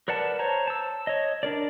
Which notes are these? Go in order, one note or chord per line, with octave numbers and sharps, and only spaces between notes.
A#4 B4 D5 F#5 A5
C5 C#5 A5 A#5
A5 E6
C#5 D#5
D4 A#4 D5